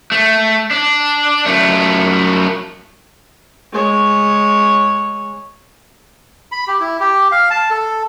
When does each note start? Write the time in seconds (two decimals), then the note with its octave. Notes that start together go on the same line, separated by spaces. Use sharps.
0.12 A3
0.71 D4
1.46 F#2 A3
3.72 G#3 C#5
6.52 B5
6.68 G4
6.80 E4
7.00 G4
7.32 F5
7.50 A5
7.71 A4